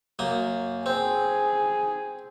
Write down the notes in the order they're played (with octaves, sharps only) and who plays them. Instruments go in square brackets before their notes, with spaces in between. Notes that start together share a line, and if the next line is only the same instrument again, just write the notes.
[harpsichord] F#2 A#3 D#6
[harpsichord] C4 [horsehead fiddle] G#4